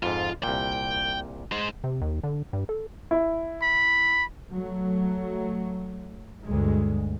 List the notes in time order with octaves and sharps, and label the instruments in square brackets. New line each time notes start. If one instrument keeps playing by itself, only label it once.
[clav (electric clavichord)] F2 G#2 [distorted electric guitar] F4
[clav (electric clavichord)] C2 A#2 [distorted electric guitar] G5
[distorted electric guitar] G#3 C5
[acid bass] C3
D#2
D3
G2
A4
[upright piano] E4
[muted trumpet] B5
[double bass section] F#3 A3
D2 G2 G#3